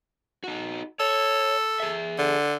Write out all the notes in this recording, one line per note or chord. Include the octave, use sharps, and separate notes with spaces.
D#4 F#4
A4 C#5
G#4 E5
D3